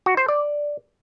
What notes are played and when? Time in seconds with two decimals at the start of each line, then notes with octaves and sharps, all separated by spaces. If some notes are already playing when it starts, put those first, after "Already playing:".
0.06 F#4
0.17 C5
0.28 D5